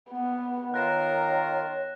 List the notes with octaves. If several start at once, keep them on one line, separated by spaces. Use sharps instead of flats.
B3
D#3 F4 A#4 C#5 F#6 A#6 E7